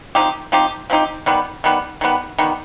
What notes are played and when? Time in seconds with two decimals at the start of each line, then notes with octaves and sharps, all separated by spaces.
0.15 F3 C4 D#4 G4
0.52 F3 C4 D#4 G4
0.90 F3 C4 D#4 G4
1.26 D#3 G3 B3
1.64 D#3 G3 B3
2.01 D#3 G3 B3
2.38 D#3 G3 B3